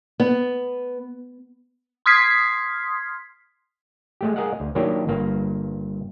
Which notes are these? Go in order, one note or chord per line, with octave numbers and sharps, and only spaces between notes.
B3
C6 D#6 F6 G#6 B6 C7
G#3 A3 G4
G#4 A#4 D#5 F5 F#5
D2
D#3 F#3 A#3 D4 E4 G4
G1 G2 A#3 F5